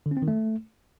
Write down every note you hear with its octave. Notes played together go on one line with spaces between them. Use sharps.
D3
C#4
C4
D#3
A3